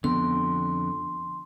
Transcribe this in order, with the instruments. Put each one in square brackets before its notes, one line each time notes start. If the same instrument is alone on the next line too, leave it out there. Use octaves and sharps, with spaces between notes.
[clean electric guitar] F2 D3 [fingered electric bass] B3 [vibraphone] C6